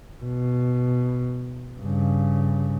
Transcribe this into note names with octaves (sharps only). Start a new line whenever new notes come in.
B2
G2 C#3